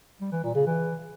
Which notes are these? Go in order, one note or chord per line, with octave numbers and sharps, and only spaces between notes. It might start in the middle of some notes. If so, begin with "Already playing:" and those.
G3
E3
A#2
C#3
E3